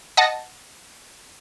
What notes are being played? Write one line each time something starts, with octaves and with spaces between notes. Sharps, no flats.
D#5 F#5 A5